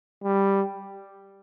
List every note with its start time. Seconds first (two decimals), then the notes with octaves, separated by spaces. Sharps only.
0.24 G3